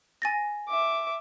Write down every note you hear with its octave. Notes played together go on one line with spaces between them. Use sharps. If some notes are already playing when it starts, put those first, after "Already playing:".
G#5 A6 A#6
E5 D6